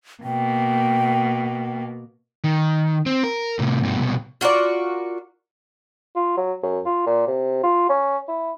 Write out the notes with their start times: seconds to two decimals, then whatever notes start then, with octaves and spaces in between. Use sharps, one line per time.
0.24 B2 A#3 G5
2.44 D#3
3.06 C4
3.24 A#4
3.59 A2 C3
3.83 G2 B2
3.98 C2 B2
4.41 F4 F#4 A#4 D5
6.16 F4
6.37 F#3
6.63 F#2
6.86 F4
7.06 A#2
7.28 C3
7.63 F4
7.89 C#4
8.29 E4